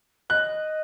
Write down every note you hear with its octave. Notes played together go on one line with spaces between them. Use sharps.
D#5 F#6